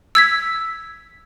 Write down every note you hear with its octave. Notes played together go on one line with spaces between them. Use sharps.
E6 G#6 B6